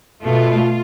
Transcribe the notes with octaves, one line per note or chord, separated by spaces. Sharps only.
B2 A3 F4